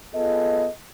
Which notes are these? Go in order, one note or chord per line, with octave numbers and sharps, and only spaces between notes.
B3 F4 G#4 A4 D#5